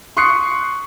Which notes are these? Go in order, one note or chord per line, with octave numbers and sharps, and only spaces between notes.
C6 C#6 D#6 F#6 C7 C#7